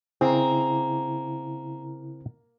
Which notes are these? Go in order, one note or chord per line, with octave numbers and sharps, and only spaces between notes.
C#3 A#3 C4 E4 G#4